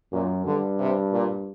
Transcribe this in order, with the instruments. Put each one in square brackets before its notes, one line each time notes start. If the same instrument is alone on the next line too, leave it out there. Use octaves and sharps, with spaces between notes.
[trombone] F#2 [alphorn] A#2
[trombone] G2 [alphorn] D3
[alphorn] C3
A#2